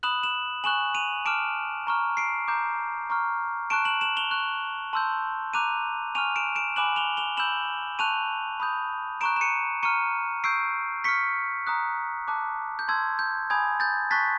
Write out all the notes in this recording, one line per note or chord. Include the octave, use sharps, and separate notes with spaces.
B5 D#6 F#6 E7 F#7
E7 F#7
G#5 C#6 F#6 E7 F#7
D#7 F7
A5 D6 F6 D7 E7
A#5 C#6 F6
C7 D7
A#5 D6 G6
A#5 C#6 F6
A5 C#6 F#6 D7 E7
E7 F#7
E7 F#7
F7 G7
C#6 F#6
A5 C6 E6 G6
A#5 D6 F#6 D#7 F7
G#5 C#6 F6 D#7 F7
D7 E7
D7 E7
G#5 B5 D6 F#6 E7 F#7
F7 G7
F7 G7
B5 E6 G6 E7 F#7
A5 C#6 F#6 D#7 F7
B5 D#6 G6
A#5 C#6 F#6 D7 E7
E7
C#7 D#7
A#5 C#6 F6 C#7 D#7
C#6 E6 G6 C7 D7
C#6 F6 B6 C#7
A#5 D#6 F#6
A5 D6 F#6
G6
A5 C6 E6 G#6
G6
G#5 B5 D#6 G6 G#6
G6 A6
A5 C#6 F#6 A6 B6